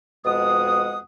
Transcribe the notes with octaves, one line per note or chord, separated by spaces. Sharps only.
F2 B2 G#3 F#5 D#6